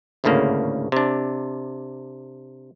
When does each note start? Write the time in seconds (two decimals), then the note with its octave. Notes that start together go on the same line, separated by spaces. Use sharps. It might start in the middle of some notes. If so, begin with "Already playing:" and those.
0.24 G#1 D2 A2 C#3 A#3
0.92 C3 D4